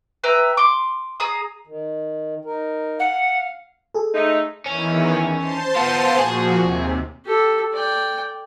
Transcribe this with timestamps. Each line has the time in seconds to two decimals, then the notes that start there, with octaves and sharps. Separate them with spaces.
0.24 B4 E5 G5 A#5
0.57 C6 D6
1.20 G#4 A#5 D#6
1.67 D#3
2.45 D#4 A#4
2.99 F5 F#5
3.94 G#4 A4
4.14 G#3 A3 D#4
4.66 E2 D#3 E3 C#4
5.36 C5 A5 C6
5.76 B3 F4
6.18 A#2 F3 F#4 G#4
6.56 D#2 C3
7.25 G4 A4
7.72 D5 G5